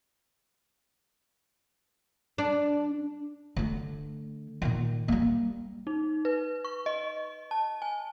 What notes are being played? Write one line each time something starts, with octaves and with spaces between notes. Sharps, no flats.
D4
D3 A3
A#2 D#3
G3 A#3
D#4
B4
C#6
D#5
A5
G#5